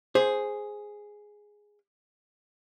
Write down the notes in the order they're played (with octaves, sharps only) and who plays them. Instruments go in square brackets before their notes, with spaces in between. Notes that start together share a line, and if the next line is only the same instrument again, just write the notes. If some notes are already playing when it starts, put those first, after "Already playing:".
[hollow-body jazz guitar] G#4 [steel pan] C5